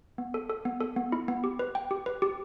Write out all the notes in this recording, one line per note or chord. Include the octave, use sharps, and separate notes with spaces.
B3
A4
A4
B3
A4
B3
E4
B3
G4
B4
G5
G4
B4
G4